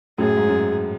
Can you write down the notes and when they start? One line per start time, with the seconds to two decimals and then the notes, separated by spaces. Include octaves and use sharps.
0.18 F#2 A2 G#4
0.37 G#2
0.49 F#2